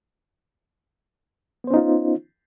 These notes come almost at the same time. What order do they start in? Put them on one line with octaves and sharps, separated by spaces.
B3 C5 C#4 D#4 F4